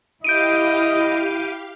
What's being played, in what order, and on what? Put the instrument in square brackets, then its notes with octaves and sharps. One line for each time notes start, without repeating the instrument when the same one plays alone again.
[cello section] E4 [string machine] G4 F5 [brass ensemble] D#5 [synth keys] G6 D7 D#7